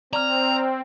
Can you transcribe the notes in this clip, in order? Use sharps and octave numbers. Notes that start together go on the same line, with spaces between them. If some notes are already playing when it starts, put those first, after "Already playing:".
C4 D5 A#5 F6